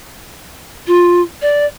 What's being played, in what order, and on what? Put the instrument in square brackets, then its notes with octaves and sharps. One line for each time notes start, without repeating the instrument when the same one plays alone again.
[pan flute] F4
D5